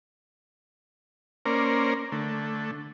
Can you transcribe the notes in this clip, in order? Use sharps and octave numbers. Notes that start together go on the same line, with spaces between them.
A#3 C#4 A#4 C5 D5
D3 A3